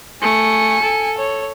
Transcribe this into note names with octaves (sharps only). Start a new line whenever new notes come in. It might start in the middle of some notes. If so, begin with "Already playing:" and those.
A3 G#5 C#7
A4
C#5